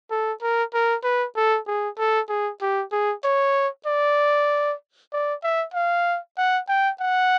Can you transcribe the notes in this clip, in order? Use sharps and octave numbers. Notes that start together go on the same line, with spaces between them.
A4
A#4
A#4
B4
A4
G#4
A4
G#4
G4
G#4
C#5
D5
D5
E5
F5
F#5
G5
F#5